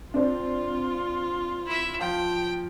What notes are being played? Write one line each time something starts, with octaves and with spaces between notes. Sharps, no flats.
C4 D4 F4
E4 E5
F3 G5